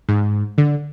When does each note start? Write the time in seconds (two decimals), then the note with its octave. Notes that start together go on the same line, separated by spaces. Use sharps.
0.09 G#2
0.58 D3